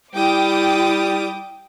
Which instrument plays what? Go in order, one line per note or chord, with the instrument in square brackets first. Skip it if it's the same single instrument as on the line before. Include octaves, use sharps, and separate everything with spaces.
[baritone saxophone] G3 [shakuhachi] E4 [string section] G5 D6 D#6